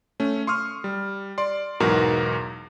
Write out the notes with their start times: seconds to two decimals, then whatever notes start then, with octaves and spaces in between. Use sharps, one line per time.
0.20 A3 C#4
0.47 C6 C#6 D#6 F6
0.84 G3
1.38 D5 C6
1.80 B1 E2 G#2 F#4 A#4 A#5